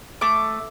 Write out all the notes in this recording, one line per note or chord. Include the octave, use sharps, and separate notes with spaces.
A3 D6